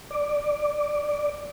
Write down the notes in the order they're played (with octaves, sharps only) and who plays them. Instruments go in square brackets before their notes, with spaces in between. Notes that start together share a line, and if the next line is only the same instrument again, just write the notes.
[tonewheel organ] D5